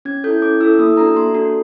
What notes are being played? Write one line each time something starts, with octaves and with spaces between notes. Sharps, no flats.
C#4 G#6
E4 A4 G6
C#4 D6
E4 A4 E6
A#3 D#6
D4 F#4 A4 A#5
A#3 C6
D4 F#4 A4